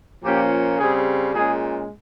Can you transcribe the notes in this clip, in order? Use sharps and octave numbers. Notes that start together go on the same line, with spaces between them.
A#2 F3 A#3 C#4 G4
C#3 G3 C4 G#4
A#2 G#3 C#4 G#4